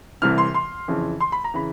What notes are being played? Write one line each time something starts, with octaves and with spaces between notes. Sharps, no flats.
C2 C3 E3 F6
C6
C6
F2 C#3 E3
C6
B5
A#5
C#3 E3 B5